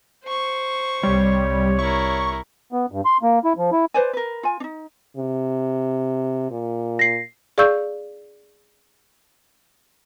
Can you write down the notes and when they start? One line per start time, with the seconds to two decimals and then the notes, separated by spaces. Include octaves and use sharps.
0.25 C5 C#6
1.03 C2 G3 C#5
1.79 E4 A#4 C#6
2.72 B3
2.92 G2
3.05 C6
3.23 A#3
3.44 E4
3.58 F3
3.72 E4
3.94 B4 C5 D5 G#5
4.13 A#4 B4
4.43 F4 G#5
4.60 D4 D#4
5.17 C3
6.51 A#2
6.99 A#6 C7
7.58 G#4 D5 F5 C#6 E6 G6